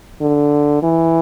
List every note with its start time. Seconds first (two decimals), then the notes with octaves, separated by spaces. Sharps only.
0.21 D3
0.83 E3